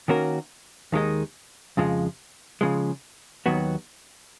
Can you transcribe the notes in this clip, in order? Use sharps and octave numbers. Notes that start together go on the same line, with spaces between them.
D#3 A#3 C#4 F#4 A#4
D#2 D#3 G#3 D#4
F2 C#3 F3 G#3
C#3 F3 G#3
D#2 D#3 F#3 B3 F#4